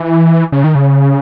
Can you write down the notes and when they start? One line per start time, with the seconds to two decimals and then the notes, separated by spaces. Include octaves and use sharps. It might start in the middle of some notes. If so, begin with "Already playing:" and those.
Already playing: E3
0.52 C#3
0.64 D#3
0.75 C#3